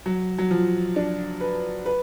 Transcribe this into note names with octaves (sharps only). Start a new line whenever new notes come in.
F#3
F#3
F3
D4
B4
B4